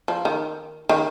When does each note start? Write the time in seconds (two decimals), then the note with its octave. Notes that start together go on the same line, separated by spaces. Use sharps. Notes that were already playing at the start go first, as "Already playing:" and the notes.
0.08 F3
0.25 D#3
0.89 D#3